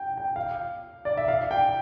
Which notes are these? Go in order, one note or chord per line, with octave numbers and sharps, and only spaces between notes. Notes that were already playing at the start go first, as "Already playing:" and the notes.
Already playing: G5
G5
F5
D5
E5
F5
G5